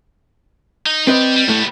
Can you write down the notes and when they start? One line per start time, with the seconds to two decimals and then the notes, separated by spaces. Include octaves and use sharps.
0.86 D#4
1.07 C4 B4 D5 D#5 G5
1.36 G3
1.48 A2 G3 A3 B3